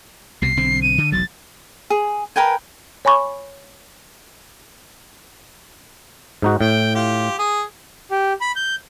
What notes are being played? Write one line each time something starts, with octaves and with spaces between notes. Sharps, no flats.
C2 B2 C7
B1 D3 C4
D#7
D3
E1 B1 F#3 A6
G#4
A#4 B4 G5 G#5
C#5 G#5 B5 C#6 D6
G#2 D#4 F#4
A2 G5
F4 G4
G#4
G4
B5
G6